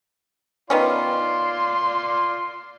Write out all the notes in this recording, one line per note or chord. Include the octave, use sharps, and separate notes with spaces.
D#3 B3 C#4 F4 D5 C6